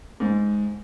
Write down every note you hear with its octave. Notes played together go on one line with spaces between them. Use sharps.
G#2